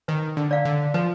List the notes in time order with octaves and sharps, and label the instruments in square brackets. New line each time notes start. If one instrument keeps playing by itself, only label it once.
[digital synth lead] D#3 [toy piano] B4
[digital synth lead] D3
[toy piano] D5 F5
[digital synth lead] D3
[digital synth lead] F3 [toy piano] B4